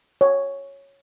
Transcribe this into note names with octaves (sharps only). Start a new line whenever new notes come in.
C#5